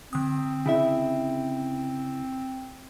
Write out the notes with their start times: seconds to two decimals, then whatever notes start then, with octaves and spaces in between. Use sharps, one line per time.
0.13 D3 C4 D#6
0.66 C#3 E4 E5